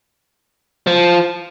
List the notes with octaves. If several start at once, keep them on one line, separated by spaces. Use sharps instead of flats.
F3